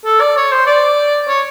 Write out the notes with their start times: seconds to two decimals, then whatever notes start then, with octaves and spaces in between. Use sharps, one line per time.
0.05 A4
0.21 D5
0.37 C#5
0.52 C5
0.67 D5
1.28 C#5